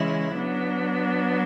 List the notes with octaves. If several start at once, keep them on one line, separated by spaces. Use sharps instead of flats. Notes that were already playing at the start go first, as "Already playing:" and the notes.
Already playing: C#3 E3 G#3 C#4 E4
F#3 B3 D4